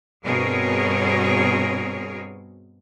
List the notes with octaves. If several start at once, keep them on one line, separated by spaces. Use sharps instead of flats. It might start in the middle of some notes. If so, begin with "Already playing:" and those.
G2 B2 C4 G#4 A#4 C#5